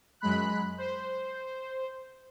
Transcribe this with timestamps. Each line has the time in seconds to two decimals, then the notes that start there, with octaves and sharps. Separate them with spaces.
0.20 F#2 F#3 G#3 B5 F#6
0.78 C5